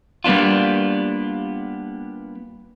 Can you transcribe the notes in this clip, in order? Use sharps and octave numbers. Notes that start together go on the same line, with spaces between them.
G3 A#3 B3 D4 F4